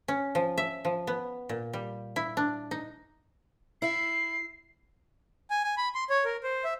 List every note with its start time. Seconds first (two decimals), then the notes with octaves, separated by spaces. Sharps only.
0.08 C#4
0.35 F3
0.58 E5
0.85 F3
1.07 B3
1.49 A#2
1.73 G3
2.16 E4
2.37 D4
2.71 D#4
3.82 E4 E5 C7
5.50 G#5
5.64 G#5
5.77 B5
5.95 C6
6.10 C#5
6.25 A#4
6.43 C5
6.64 E5